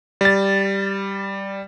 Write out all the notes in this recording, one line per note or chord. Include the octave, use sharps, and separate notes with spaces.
G3 A6